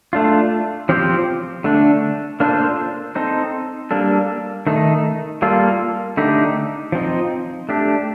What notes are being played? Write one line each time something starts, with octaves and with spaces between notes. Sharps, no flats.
A3 D4 F4
F3 C4 G4 C5
D3 A3 D4
A#3 D4 F4 A4 C5
C4 D#4 A4 C5
G3 A#3 D4 A4
D#3 A3 D#4
G3 A#3 F4 A4
D3 A3 D#4 G4
F3 C4 D#4
A3 D4 G4